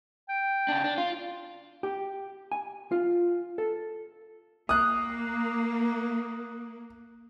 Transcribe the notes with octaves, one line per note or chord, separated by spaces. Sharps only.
G5
C#3 D4
D4
F4
G4
G#5
F4
A4
A#3 D#6 F#6